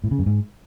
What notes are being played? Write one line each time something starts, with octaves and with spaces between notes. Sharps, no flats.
A2
C#3
F#2
G#2